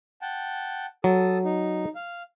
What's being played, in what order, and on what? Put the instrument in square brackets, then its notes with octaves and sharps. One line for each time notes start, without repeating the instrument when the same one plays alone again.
[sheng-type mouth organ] F#5 G5 A5
[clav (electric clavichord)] F#3 [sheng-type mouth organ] A4 D#6
[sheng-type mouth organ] D#4
F5